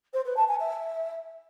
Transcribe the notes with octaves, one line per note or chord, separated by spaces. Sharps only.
C5
B4
A5
G#5
E5